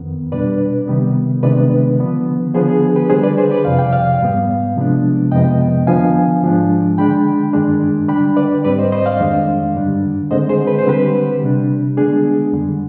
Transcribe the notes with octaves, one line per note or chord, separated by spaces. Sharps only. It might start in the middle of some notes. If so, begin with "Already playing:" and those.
Already playing: F2 D#3 B3
B2 G3 D4 B4 D5
C3 D#3 G3 B3
C3 D#3 G#3 B3 D4 B4 D5
D3 F3 B3
D3 F3 B3 D4 G#4 C5
G#4
G4 B4
D3 G3 D4 G#4 C5
B4 D5
G#4 C5
B4 D5
F2 C3 F3 F5
G5
D5 F5
G#2 G3 B3
C3 F3 G#3 B3 D4
F2 C3 F3 G#3 B3 D#5 G5
D3 F3 B3 D4 F5 G#5
G#2 F3 G#3 D4
D3 G#3 D4 G5 B5
G2 D#3 G#3 D4
D3 G3 D4 G5 B5
B4 D5
G#2 G3 C4 B4 D5
C5 D#5
C5 D#5
D5 F5
F2 D#3 G#3 D4
G2 D3 G3 D4
D3 G#3 C4 C5 D#5
G#4 C5
B4
C5
D3 G3 C4 G4 B4
C3 G3 D4
D3 G#3 B3 D4 G#4
F2 D3 G3